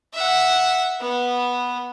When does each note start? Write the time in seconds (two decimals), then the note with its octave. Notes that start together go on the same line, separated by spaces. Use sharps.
0.14 E5 F#5
1.01 B3